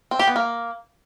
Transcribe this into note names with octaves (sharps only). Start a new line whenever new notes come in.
C4
G4
B3
A#3